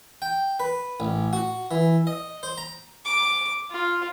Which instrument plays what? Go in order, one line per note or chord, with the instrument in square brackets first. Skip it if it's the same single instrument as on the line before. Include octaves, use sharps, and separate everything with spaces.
[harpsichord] G5
B4
A1
F#4
E3
D#5
C5
A#5
[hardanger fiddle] D6
F4